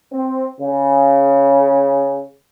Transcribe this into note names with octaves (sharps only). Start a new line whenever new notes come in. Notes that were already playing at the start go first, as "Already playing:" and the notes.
C4
C#3